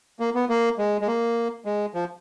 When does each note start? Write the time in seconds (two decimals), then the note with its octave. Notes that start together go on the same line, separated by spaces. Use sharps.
0.20 A#3
0.35 B3
0.49 A#3
0.78 G#3
1.01 G#3
1.07 A#3
1.65 G#3
1.94 F3